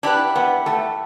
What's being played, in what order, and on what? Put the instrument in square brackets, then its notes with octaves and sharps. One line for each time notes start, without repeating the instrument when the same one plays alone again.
[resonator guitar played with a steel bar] D4 [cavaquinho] E4 G4 B4 F#5
[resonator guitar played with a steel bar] B3
A3